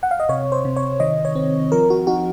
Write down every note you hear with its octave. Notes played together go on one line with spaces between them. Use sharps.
F#5
F5
D#5
C3 C#5
C5
C3
C#5
D#3 D#5
C#5
C4
F3 A#4
F#4
D#4 F#4